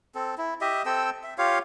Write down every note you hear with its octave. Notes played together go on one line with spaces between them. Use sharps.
C4 A4
E4
G4 D#5 E5
C4 A4 G5 E6
E5
F4 G4 C#5 F5